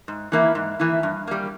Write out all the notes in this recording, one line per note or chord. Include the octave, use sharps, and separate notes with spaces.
G#2
E3 A#3 E4
G#2
E3 A#3 E4
G2
G3 A#3